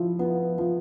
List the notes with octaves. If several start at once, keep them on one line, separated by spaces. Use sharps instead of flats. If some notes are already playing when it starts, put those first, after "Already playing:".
Already playing: F3 E4
B3
F3